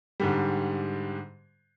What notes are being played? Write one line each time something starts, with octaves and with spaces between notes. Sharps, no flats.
G#2 D3 G3